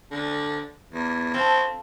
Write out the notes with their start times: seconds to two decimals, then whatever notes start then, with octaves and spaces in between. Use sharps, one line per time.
0.11 D3
0.93 E2
1.34 C4 F4 A4